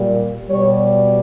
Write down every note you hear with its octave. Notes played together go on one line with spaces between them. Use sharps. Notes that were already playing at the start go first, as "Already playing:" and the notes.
Already playing: A#2 G3
B2 G3 C#5